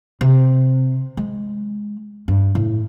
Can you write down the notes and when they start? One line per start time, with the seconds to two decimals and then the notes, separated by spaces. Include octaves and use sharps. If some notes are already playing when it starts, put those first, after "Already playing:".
0.21 C3
1.17 G#3
2.28 G2
2.55 A2